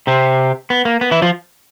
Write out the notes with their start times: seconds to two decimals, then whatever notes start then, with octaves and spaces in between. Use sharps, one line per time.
0.07 C3 C4
0.70 B3
0.85 A#3
1.01 B3
1.11 E3 E4
1.22 F3 F4